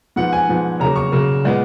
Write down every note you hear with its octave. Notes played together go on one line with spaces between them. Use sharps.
G#2 F3 B3 F#5
G#5
G#2 F3 B3
C#3 F#3 A#3 A#5
C#6
C#3 F#3 A#3
A#2 G#3 B3